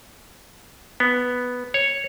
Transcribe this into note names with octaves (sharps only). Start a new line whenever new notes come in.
B3
C#5